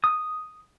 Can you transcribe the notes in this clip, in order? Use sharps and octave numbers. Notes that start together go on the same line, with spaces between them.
D#6